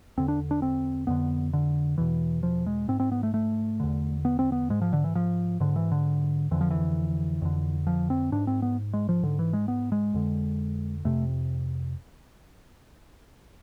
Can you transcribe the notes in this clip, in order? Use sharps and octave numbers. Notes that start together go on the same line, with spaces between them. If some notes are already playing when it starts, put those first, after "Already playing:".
E2 D3 C4
D4
D4
C4
F2 D3 B3
D3
E2 B2 E3
F3
G#3
G#2 C4
C4
B3
A3
A3
E2 D3
B3
C4
B3
G#2 G#3
F3
D3
E3
F3
G#2 D3
E3
D3
F2 D3 E3
F3
E3
F2 D3
F3
C4
G#2 D4
C4
B3
G#3
F3
G#2 D3
E3
G#3
B3
G#3
F2 D3
F2 C3 A3